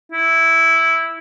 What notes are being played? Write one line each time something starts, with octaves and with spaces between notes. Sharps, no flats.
E4